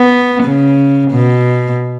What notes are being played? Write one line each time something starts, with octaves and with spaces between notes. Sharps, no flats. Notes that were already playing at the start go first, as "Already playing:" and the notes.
Already playing: B3
C#3
B2